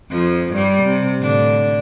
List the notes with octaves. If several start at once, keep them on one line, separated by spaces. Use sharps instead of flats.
F2 F3
G2 G3
C3
A2 D3 D4